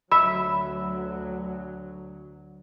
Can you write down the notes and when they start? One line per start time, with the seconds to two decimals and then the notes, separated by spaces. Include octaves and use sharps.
0.12 D2 F#3 E5 B5